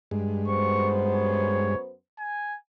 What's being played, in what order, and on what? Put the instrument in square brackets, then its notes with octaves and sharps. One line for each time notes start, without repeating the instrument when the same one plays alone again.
[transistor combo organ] G2 G#3
[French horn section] F#2 B3 C5 [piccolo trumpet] C#6
[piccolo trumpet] C#5
G#5